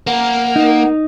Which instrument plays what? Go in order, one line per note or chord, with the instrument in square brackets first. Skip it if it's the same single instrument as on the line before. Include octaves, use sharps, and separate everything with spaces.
[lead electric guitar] A#3 [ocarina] F#5
[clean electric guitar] D#4